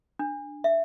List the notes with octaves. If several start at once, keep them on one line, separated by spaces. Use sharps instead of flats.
D4
E5